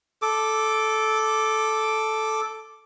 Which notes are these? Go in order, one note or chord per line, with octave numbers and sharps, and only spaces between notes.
A4 D6